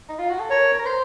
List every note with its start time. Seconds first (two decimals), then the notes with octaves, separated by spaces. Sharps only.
0.09 D#4
0.19 F4
0.30 F#4
0.40 A4
0.50 A#4 C#5
0.79 A#4
0.86 C5